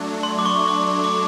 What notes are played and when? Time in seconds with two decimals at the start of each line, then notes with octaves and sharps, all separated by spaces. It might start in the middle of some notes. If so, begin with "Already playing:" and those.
Already playing: F#3 A3 D4
0.23 C6
0.39 D6
0.46 C#6
0.68 D6
1.04 D6